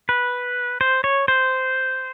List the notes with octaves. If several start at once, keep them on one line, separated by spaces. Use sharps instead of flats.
B4
C5
C#5
C5